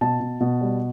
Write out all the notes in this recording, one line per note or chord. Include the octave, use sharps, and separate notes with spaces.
B2 A5
B2
B2
G3